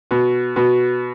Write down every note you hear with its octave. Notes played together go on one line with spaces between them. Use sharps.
B2
B2